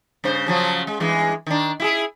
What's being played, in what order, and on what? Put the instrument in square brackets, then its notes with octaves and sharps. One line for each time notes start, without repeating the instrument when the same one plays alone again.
[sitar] G2 C#3 C5
C#3 F3 F#3
G#3
G2 E3 G#3
D#3 D4
E4 G4 G#4